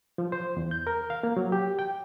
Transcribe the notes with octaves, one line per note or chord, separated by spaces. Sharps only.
F3
C5
E2
G6
A#4
F5
A#3
F#3
G4
G5